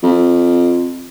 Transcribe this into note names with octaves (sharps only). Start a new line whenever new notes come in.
F2